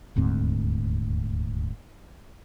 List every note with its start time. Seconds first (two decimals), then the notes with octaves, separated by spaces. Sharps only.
0.16 D#1 D2 G#2 C4